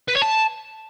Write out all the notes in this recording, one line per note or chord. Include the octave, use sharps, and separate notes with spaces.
B4
C#5
A5